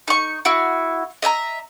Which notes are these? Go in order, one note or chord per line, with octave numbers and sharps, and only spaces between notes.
D#4 C#6
E4 F#4
D#5 E5 G#5 A#5